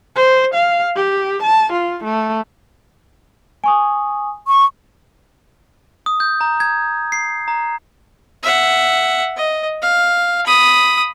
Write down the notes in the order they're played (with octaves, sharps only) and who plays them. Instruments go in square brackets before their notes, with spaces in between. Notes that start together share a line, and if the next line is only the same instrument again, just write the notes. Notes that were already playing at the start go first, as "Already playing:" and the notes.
[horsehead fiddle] C5
F5
G4
A5
F4
A3
[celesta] G#5 C#6 D#6
[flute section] C#6
[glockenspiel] D#6
G6
A#5
G#6
C7
A#5
[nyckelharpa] E5 F#5
D#5
F5
B5 D#6